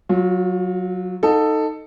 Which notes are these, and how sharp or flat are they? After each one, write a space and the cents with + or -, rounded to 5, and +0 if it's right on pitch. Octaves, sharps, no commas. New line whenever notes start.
F#3 +0 F4 +35
D#4 +0 A4 +10 F#5 -45